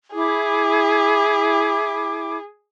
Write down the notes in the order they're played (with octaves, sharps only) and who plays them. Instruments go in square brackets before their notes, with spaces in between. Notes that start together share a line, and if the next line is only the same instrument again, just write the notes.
[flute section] E4 D6 [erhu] G#4